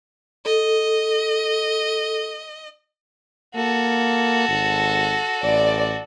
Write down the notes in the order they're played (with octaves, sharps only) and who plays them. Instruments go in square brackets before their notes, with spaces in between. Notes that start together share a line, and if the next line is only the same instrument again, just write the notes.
[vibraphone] A4 [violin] D#5
[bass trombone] A#3 [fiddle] F#4 A4
[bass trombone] G#1
[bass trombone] A1 [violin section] D5